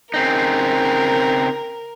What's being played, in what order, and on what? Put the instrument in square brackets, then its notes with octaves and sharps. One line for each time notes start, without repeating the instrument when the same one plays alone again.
[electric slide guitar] C#3 C4 D#4 [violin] A#4